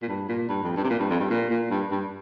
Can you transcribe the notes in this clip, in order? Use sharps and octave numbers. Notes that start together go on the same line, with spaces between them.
A#2
G2
A#2
G2
F2
G2
C3
A#2
G2
F2
G2
A#2
A#2
G2
G2